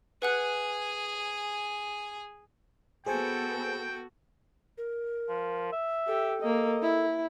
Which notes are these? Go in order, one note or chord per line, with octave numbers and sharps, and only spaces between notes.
G#4 B4 F#5 G#5 F#6
B3 F#4 G#4 A4 C5 G5 G#5
A#4
F3
E5
G4 A4
A#3 D#5
E4